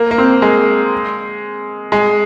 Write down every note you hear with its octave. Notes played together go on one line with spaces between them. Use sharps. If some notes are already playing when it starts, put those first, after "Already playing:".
Already playing: A#3
A#3
C4
G#3
G#3